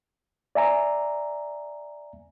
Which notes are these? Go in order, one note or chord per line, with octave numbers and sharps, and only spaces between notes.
D5 E5 G#5 A#5